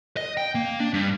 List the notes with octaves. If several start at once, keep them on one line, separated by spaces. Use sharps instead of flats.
D#5
G5
A#3
D4
G2